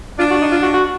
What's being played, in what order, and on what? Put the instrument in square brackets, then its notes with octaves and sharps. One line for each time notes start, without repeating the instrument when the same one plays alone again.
[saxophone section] D4 [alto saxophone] F4
[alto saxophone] F#4
D#4
F4
F#4
F#4